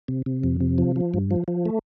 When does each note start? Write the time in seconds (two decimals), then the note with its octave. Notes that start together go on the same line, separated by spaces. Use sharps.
0.08 C3
0.26 C3
0.43 F2
0.60 C3
0.78 F3
0.96 F3
1.14 G2
1.31 F3
1.48 F3
1.66 A3